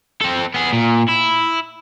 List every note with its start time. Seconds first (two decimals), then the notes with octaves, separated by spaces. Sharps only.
0.21 C4 A4
0.54 B3 G#4
0.73 A#2
1.09 E4